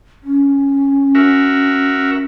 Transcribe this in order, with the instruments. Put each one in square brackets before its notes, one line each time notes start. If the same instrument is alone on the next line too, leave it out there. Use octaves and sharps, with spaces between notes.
[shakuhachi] C#4
[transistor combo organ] F#4 A#4 E5